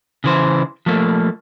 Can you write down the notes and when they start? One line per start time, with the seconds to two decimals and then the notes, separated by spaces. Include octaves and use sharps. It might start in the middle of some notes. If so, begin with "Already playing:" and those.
0.24 C#3 E3 C5
0.86 F3 A3 A#3